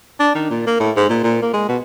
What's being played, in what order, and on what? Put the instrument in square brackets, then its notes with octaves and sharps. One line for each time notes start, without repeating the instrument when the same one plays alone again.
[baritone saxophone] D4
D#3
A#2
A#3
A2
G#2
A#2
A#2
A#3
G#3
B2